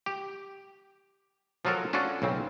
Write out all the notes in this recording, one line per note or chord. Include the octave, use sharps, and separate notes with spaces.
G4
F3 F#3 F4 F#4 A4 A#4
C#4 D4 F4 F#4 A4
B1 C#3 C4